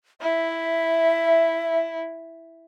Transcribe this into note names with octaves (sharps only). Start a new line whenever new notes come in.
E4 E5